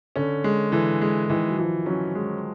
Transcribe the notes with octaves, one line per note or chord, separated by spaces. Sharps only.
D3 C#4
G#3
D3 E3
G#3
D#3 E3
F#3
E3 F3
F#3 C#4
G#3